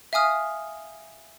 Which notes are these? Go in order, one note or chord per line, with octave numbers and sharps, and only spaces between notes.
E5 F5 G#5 D#6 F6